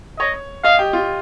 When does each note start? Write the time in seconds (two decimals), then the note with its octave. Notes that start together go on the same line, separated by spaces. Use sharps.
0.19 C#5 D#5
0.64 D#5 F5
0.79 G4
0.93 F4